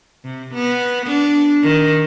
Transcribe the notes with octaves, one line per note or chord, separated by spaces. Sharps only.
C3
B3
D4
D#3